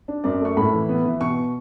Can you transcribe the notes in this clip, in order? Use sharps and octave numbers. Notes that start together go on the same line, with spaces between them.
D4
F#2 D5
A3 C#6
A2 B5
E3
B3
E3
B2 C#6